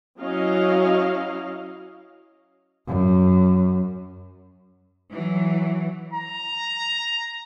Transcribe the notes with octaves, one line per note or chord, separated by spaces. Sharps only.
F#3 C#4 E4 D#5 F5
F#2
E3 F#3
A#5